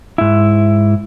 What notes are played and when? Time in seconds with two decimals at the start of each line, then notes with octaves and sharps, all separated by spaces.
0.18 G#2 E4